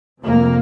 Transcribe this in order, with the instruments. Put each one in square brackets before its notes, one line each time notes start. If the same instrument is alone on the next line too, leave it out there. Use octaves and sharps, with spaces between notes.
[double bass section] F2 C3 A#3